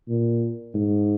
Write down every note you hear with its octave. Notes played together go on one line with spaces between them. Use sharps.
A#2
G#2